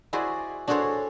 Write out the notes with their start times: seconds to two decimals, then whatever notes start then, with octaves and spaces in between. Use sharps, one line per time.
0.13 E4 F#4 G#4 C5 D5 D#5
0.68 D4 F#4 G#4 A4 C5 C#5